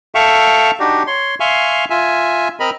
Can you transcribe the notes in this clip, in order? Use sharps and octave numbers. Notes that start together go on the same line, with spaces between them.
A4 E5 F5 G5 C#6
D4 D#4 F#4 G4
C#5 C6
E5 F5 G#5 C6 C#6
F4 E5 G#5
C4 A#4 D#5 B5